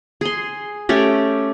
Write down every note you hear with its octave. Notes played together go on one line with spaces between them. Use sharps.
G#4 C6
A3 C#4 G4